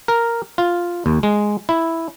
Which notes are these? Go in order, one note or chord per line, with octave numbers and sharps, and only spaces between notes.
A#4
F4
D#2
G#3
E4